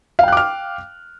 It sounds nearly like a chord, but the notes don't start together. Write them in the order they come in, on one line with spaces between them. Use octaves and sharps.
F5 G5 F#6 D6 F6